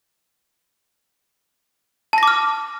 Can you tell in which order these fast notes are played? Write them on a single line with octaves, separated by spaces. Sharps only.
A5 A#6 D6 F6